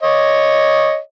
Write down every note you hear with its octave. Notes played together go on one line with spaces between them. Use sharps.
C#5 D#5